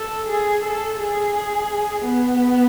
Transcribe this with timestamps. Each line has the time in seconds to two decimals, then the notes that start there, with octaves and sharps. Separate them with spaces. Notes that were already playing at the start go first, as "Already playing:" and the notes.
Already playing: A4
0.29 G#4
0.64 A4
0.99 G#4
2.02 B3